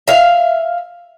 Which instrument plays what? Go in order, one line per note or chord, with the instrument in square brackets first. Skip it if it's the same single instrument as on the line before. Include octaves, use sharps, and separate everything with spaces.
[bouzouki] E5 F5